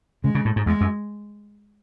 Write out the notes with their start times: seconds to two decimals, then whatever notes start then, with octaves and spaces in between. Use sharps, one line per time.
0.24 C#3 G#3
0.35 C#3
0.45 A2
0.56 G#2
0.66 E2 G#3
0.81 F#2